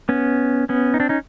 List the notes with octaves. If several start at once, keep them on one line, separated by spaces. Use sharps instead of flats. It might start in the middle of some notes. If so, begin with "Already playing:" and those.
B3 C#4
B3 C#4
D#4
C4 D4
C#4 D#4